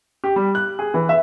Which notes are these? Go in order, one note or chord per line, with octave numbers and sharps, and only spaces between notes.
G4
G3
F#6
G#4
E3
E5